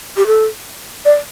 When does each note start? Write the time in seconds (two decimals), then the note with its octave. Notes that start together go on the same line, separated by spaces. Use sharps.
0.17 G4
0.27 A4
1.05 D5